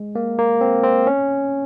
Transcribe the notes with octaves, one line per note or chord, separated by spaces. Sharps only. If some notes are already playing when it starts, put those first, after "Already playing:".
Already playing: G#3
A#3
A#3
C4
C4
C#4